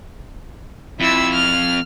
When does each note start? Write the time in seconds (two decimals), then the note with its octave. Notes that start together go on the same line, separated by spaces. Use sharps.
1.00 F2 E4 E6
1.33 F6